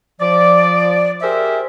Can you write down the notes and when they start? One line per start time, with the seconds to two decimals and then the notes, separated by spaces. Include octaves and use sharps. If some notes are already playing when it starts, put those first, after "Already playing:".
0.21 F3 D5
1.22 G4 G#4 A#4 C5 E5